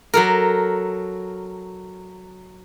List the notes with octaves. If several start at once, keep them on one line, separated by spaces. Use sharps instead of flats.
F#3 A4 A#4